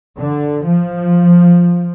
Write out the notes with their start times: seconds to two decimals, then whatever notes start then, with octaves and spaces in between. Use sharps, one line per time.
0.20 D3
0.67 F3